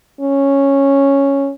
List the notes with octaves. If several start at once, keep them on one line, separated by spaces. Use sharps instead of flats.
C#4